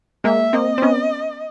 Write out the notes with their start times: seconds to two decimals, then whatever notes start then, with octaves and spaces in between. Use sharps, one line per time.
0.24 G#3 A#3 E5
0.53 A#3 C4 D#5
0.78 C4
0.82 B3 C#4